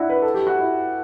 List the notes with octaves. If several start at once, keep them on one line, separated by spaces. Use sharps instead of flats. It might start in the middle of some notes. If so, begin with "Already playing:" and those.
Already playing: D4 E4 F#4
B4
A4
G4
F#4
E4